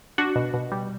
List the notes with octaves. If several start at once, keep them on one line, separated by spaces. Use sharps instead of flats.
D4 F#4
B2
B2
G3